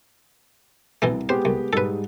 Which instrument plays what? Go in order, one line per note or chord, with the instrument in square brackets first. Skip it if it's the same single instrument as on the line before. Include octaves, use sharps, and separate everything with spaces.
[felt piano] C2 [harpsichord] B2 E3 A3
[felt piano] G#3 B3 G4 [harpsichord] C5
[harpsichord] C2
[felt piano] G#2 G3 G#3 [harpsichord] A4 B4